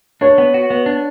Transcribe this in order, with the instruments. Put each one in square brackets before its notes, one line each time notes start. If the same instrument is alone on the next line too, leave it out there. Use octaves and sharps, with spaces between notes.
[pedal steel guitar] D4 [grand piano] C#5
[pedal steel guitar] B3
F#4
B3
D4